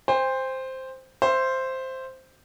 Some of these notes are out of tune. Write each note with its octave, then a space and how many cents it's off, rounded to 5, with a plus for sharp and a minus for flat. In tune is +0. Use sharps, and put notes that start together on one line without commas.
C5 +0 G5 +45
C5 +0 E5 +30